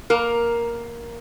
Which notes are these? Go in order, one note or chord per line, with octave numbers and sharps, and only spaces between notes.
A#3 A#4